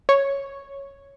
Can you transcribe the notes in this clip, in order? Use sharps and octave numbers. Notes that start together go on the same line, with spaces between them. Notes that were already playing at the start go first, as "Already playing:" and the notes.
C#5